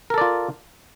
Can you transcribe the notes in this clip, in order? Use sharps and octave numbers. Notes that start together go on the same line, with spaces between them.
F4 A4 A#4 D5